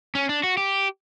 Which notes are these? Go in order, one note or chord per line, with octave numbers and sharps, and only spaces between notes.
C#4
D4
F#4
G4